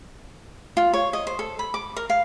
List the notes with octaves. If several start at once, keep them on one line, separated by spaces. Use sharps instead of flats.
F4
C#5
D#5
C5
A4
B5
D6
A#4
F5